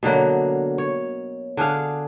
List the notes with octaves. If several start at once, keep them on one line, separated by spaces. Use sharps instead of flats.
B2 D3 F#3 A#3
C#5
D3 D4 G#4 F5